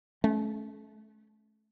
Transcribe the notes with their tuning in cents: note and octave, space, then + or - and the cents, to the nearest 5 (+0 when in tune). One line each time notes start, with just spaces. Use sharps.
A3 -35 C#4 +0